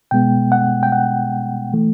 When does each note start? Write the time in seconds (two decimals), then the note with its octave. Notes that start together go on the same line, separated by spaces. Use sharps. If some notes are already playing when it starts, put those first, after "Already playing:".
0.11 B2 G#3 B3 G5
0.52 F#5
0.83 G5
0.92 F#5
1.73 E3 A3